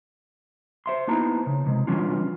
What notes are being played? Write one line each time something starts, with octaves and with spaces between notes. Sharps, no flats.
C5 E5 C6
A#3 B3 D#4 E4 A5 A#5
C#3
C3 G#3
E3 G3 C#4 D4 F4